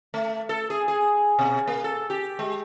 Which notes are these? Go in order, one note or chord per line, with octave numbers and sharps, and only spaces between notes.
A3
A4
G#4
G#4
B2
A#3
A4
G4
G#3